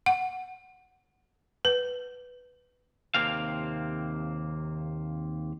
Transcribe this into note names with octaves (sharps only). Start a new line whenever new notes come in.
F#5
B4
D#2 C3 A#3 C4 F5